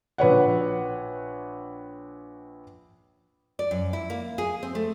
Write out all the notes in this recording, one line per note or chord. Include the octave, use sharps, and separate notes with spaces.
A#1 B4 C#5 F#5
D5
F#2
E4
A#3
G#4
C4
A3